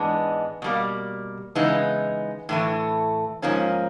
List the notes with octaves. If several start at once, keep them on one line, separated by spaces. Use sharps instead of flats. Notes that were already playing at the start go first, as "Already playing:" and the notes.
Already playing: G#2 E3 G#3 B3 D4
B2 G3 A#3
C#3 E3 G#3 B3 D#4
A2 E3 A3
G#2 F3 A#3 C#4